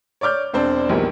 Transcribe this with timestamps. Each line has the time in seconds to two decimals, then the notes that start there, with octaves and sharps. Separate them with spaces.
0.21 C#5 D5 D6 F6 G6
0.53 E1 C4 D4 C5
0.89 A#1 E2 D#3 G3